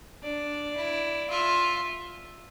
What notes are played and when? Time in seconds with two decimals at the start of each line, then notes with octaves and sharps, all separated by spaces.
0.23 D4 D5
0.77 E4
1.30 F4 E5